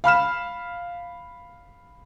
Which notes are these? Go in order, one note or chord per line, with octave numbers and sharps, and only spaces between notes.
F5 B5 F6 E7